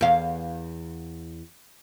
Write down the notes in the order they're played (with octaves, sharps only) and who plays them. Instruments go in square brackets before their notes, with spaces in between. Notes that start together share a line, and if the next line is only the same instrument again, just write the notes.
[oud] E2 F5